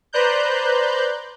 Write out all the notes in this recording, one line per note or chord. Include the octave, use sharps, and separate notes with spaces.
B4 C5 D5 A#5 F#6 G6